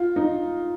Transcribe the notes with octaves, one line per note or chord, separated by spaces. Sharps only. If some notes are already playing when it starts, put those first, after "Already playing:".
Already playing: F4
D#4